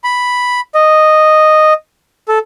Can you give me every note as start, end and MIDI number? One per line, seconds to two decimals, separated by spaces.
0.04 0.60 83
0.75 1.73 75
2.28 2.39 69